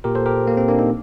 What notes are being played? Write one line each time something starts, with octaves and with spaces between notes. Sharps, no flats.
A#2 G4 A#4
A4 C5
G4 A#4
A#3
C4
A#3 D4
C4 D#4